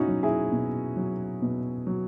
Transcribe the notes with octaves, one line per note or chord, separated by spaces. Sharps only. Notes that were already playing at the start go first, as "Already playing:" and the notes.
Already playing: B2 C#4 D#4 E4 F#4
F#3
E4 G#4
B2
F#3
B2
F#3